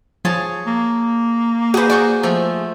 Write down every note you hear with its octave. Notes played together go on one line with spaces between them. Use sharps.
F3 G#4 C#5 A5
A#3
F#4 G#4 B4 C5
F#4 D5 C#6 G6
F3 A3